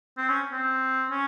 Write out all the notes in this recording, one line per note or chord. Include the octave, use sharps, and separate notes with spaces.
C4
C#4
C4
C#4